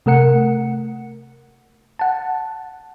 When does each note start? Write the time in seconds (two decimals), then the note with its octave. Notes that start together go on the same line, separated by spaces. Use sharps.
0.06 C3 A3 A#4 F#5 C#7
1.99 F#5 A5